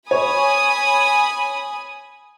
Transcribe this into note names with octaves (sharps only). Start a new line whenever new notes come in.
C#5 G#5 B5 D#6